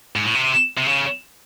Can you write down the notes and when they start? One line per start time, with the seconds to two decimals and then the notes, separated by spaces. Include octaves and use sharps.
0.16 G#2
0.24 A2
0.35 C3
0.78 C3
0.87 C#3